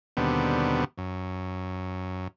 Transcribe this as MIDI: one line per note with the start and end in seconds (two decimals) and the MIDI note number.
0.17 0.84 39
0.17 0.84 47
0.17 0.84 50
0.17 0.84 55
0.17 0.84 59
0.17 0.84 60
0.98 2.28 42